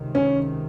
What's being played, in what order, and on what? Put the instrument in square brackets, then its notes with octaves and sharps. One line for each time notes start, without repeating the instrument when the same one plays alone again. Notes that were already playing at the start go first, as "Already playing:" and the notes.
Already playing: [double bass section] C#2 C3 D#3
[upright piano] C#4